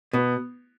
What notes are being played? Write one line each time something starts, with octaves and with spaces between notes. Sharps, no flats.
B2 B3